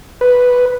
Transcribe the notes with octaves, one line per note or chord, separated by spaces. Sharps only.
B4